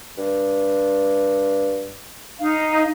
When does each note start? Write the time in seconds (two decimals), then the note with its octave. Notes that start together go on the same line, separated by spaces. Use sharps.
0.18 G2
2.39 D#4 F5